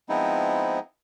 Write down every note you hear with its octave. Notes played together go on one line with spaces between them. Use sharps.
F3 G#3 B3 C4 D#4 E4